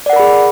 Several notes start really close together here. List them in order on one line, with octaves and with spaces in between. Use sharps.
D5 F#5 A#4 B5 G#4